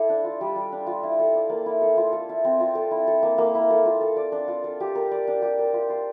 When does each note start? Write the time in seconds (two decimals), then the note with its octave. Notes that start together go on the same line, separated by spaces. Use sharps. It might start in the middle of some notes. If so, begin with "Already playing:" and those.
Already playing: E4 A4 D5
0.09 D4
0.24 F4
0.41 G3
0.56 G3
0.72 D4
0.87 F4
1.03 E4
1.19 A4
1.34 D5
1.50 A#3
1.66 E4
1.82 A4
1.97 F4
2.13 A4
2.29 E5
2.44 C4
2.60 F4
2.75 A4
2.91 E4
3.07 A4
3.23 A#3
3.38 A#3
3.55 E4
3.70 A4
3.85 F4
4.01 A4
4.16 D5
4.32 D4
4.48 F4
4.64 A4
4.80 G4
4.95 A#4
5.11 D5
5.27 D4
5.42 G4
5.59 A#4
5.73 F4
5.90 C5